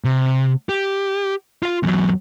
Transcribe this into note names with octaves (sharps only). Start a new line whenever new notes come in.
C3
G4
F4 F5
E2 F#3